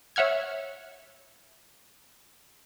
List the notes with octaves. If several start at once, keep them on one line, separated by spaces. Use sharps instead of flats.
C#5 E5 F#5 F6 G#6